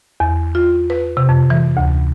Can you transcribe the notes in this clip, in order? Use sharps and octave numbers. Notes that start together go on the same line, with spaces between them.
E2
F4
B4
C3
F2
E3
D2